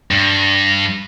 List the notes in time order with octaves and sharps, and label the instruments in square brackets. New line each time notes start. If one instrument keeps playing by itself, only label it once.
[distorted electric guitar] G2